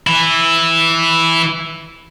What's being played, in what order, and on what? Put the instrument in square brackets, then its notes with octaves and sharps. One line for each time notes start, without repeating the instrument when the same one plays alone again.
[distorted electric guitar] E3 E4